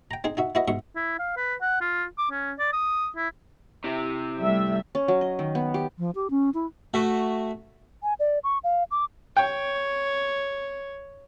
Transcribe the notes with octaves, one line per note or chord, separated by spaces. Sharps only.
G5 A#5
C4 D#4 G#4
D#4 F#4 E5
E4 F#4 B4 D#5 E5
G#2 B2 E5 C#6
E4
F5
B4
F#5
F4
D6
C#4
D5
D#6
E4
C3 E4 G4
G3 A3 E5
C#4
F#3
D#5
D#3
B3
G4
F3
G4
C#4
E4
A3 F#4 A4 E5
G#5
D5
C#6
F5
D6
C#5 G5